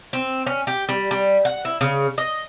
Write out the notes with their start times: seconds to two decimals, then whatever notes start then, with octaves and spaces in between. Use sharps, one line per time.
0.13 C4
0.46 C#4
0.67 G4
0.89 G3
1.11 G3
1.45 F#5
1.65 E4
1.81 C#3
2.18 D#5